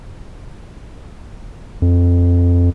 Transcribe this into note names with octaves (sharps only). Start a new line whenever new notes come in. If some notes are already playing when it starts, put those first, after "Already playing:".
F2